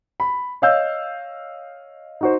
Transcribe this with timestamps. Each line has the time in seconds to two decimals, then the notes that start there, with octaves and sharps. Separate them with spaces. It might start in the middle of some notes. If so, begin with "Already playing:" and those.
0.20 B5
0.62 C#5 D#5 F5 E6 G6
2.21 D#4 F#4 C5